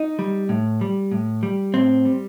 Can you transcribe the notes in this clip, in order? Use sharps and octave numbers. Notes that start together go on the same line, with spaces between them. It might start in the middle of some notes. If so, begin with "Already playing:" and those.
Already playing: D#4
G3
A2
G3
A2
G3
A2 C4
G3